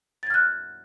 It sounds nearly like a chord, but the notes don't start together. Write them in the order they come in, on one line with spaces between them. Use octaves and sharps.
A6 G#6 F6 F#6